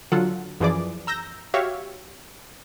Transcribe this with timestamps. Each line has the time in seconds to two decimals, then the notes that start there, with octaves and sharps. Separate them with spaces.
0.12 D3 F#3 F4 A4 F#5
0.60 F#2 E3 F3 G#4 D5 D6
1.07 A#5 E6 G6 A#6
1.54 F#4 G4 C#5 E5 F5